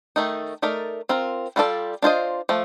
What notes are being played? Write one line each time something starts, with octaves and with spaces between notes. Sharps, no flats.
D#3 A3 D#4
A3 D#4 A#4 D5
C4 F4 A#4
G3 D4 F4 A4 D5
D4 F4 C5 D#5
F3 A3